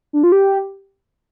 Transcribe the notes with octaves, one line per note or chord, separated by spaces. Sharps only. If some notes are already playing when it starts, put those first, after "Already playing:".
D4
F4
G4